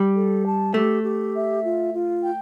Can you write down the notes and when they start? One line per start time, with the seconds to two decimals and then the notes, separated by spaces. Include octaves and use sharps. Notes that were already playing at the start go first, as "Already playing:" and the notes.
Already playing: G3
0.15 A4
0.44 A5
0.74 A3 G4
1.04 G4
1.34 E5
1.64 F4
1.94 F4
2.23 G5